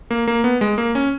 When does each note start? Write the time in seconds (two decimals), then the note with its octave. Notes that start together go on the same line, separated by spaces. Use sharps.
0.11 A#3
0.27 A#3
0.44 B3
0.61 G#3
0.78 A#3
0.95 C#4